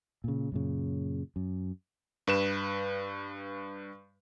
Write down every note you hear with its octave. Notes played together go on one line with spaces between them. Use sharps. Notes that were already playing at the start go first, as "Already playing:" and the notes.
A#2 C#3
F#2 A#2 C#3
F#2
G2 B4 E7